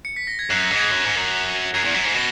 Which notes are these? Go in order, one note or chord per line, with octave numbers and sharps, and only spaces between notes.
C#7
B6
A#6
G#6
F#2 F#6
A#6
G#2
G#6
F#2
G#2
F#2
F#2 G#6
E2
F#2
G#2
B2 A#6